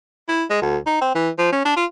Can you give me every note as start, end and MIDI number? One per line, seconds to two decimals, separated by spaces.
0.28 0.44 64
0.50 0.61 56
0.62 0.77 38
0.86 0.98 63
1.01 1.10 60
1.15 1.29 52
1.38 1.51 53
1.52 1.61 61
1.65 1.76 62
1.77 1.85 65